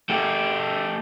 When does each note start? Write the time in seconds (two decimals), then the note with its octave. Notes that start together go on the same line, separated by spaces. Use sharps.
0.10 A3 G4